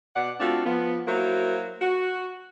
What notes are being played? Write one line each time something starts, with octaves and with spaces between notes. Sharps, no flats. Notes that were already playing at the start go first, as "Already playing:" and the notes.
B2 D5 F#5
A3 C4 D4 F4 F#4
F3 B3
F#3 A#3 E4 F#4 C5
F#4